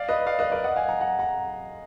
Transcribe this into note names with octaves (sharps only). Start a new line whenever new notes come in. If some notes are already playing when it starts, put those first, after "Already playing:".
Already playing: D5 F5
B4 D#5
D5 F5
B4 D#5
A#4 D5
D#5 F#5
F5 G#5
F#5 A#5
F#5 A#5
F#5 A#5